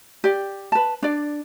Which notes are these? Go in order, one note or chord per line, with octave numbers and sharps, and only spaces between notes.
G4 D5
B4 A5
D4 D5